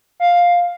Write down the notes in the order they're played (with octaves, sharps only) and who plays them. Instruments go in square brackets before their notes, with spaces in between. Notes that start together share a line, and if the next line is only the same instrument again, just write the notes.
[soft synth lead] F5